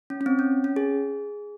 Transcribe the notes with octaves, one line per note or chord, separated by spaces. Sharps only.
C#4
C#4
C4
C#4
C#4
G#4